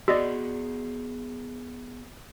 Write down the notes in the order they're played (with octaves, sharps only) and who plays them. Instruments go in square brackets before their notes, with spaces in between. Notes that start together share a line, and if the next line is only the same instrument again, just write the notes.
[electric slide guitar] B3 G#4 F#5 [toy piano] F#4 [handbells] D5 D#5 E6